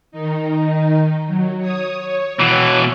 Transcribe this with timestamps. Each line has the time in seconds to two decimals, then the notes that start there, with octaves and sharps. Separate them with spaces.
0.12 D#3 D#4
1.27 F#3
1.59 C#5 D#6
1.98 C#5
2.39 B2 E3